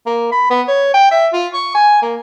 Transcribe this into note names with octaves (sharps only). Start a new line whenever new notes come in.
A#3
B5
B3
C#5
G5
E5
F4
C#6
G#5
A#3